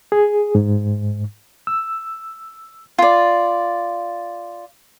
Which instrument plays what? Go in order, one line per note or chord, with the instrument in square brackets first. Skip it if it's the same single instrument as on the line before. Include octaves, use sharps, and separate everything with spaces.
[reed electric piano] G#4
G#2
E6
[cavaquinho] F4 D5